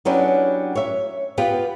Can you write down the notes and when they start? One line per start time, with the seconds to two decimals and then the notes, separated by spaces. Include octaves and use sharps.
0.05 F#3 B3 C#4 D4 E4 G4
0.75 C#5 E5
1.38 B3 F4 G4 B4